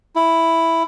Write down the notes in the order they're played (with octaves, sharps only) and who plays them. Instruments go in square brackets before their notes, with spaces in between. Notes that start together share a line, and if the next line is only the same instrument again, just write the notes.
[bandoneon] E4